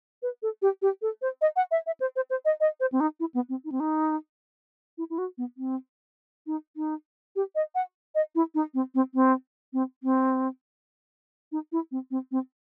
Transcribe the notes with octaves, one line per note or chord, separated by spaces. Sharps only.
B4
A4
G4
G4
A4
C5
D#5
F#5
E5
E5
C5
C5
C5
D#5
D#5
C5
C4
D#4
E4
B3
C4
D#4
C4
D#4
E4
E4
F#4
B3
C4
D#4
D#4
G4
D#5
F#5
D#5
E4
D#4
C4
C4
C4
C4
C4
D#4
E4
C4
C4
C4